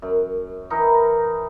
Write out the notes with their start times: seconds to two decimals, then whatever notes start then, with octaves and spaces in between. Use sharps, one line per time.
0.02 F#2
0.70 E3 D#4 E4 A#4